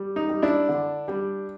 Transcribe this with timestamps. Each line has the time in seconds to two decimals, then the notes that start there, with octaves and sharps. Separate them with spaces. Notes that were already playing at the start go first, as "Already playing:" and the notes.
Already playing: G3
0.16 D#4
0.29 G3
0.42 D4 E4
0.69 D3
1.08 G3